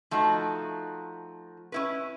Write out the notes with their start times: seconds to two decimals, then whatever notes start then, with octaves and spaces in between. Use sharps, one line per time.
0.11 F3 A3 D#4 F#4
1.72 C#4 E4 B4